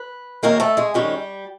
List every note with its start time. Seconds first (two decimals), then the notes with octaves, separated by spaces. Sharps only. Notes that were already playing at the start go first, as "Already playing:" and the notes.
Already playing: B4
0.43 F#2 D#3 G#3 A#3 C#4 A#4
0.60 A3 A4
0.77 G#3 G#4
0.94 F#2 D#3 G3 G#3 C#4 G4